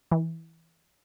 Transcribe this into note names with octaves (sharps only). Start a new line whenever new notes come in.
E3